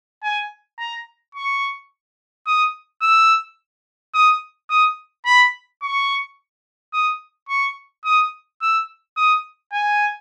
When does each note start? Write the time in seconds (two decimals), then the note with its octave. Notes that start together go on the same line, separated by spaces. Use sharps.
0.23 G#5
0.79 A#5
1.35 C#6
2.47 D#6
3.02 E6
4.14 D#6
4.70 D#6
5.26 B5
5.82 C#6
6.93 D#6
7.49 C#6
8.05 D#6
8.62 E6
9.17 D#6
9.73 G#5